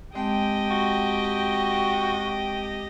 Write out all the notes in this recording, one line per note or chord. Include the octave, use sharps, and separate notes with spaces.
G#3 C4 G4 D#5 G5 A5
F#4